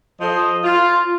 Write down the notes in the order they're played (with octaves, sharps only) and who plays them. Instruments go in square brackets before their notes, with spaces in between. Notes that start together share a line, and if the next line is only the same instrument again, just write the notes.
[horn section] F3 A4 C5 D#5
F4